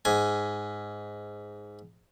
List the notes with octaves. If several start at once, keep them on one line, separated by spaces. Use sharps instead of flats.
G#2 G#5